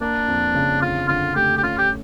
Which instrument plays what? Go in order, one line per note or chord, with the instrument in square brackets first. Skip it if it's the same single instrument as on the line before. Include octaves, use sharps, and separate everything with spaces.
[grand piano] A#3 [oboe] D4
[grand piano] F2
C#3
[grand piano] D3 [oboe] F4
[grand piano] D3 [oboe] F4
[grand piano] A3 [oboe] G4
[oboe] G4
[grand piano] C#4 [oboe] F4
[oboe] G4